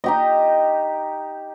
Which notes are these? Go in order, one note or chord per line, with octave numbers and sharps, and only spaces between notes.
D#4 G4 D#5